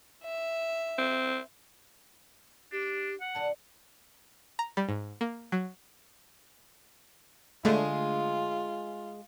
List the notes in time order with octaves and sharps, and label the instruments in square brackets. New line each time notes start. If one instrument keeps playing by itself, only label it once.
[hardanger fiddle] E5
[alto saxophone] C4
[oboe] D4 [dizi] G4
[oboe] F#5
[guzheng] A#2 D3 F#3 [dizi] A5
[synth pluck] A#5
G3
G#2
A#3
F#3
[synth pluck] D3 A3 D4 [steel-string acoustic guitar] G#3 G#4 [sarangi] F4